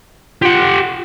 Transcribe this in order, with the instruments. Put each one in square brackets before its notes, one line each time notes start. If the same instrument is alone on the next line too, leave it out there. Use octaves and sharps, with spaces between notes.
[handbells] F4 [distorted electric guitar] G4 F#5